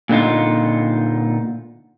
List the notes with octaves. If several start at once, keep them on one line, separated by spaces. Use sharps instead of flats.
A#2 D3 D#4 F4